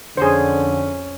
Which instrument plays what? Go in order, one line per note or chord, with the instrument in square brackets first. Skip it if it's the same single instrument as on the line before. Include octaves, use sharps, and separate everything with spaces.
[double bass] F2 C#4 [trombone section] D3 [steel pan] G#4 C5